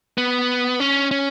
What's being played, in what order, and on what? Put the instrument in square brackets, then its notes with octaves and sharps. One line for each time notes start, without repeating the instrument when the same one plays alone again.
[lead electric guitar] B3
C#4
C#4